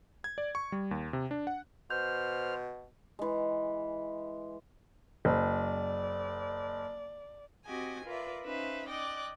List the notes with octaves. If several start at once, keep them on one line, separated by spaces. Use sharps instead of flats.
G#6
D5
C#6
G3
D#2
C3
D4
F#5
B2 C5 F6 G6
E3 G#3
F#1 D5
C4 F#4 G4 D#5 G#5
F4 A#4 B4 D5 E5
C#4 D#4 B4 C5 E5 F5
D5 D#5 G5 F#6